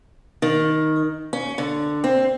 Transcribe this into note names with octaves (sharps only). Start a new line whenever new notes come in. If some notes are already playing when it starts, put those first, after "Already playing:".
D#3
C#4
D3
C4